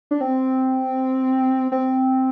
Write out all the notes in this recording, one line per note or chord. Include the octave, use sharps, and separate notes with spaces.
D4
C4
C4